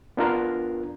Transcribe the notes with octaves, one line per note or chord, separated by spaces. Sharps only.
B3 D4 F4 A#4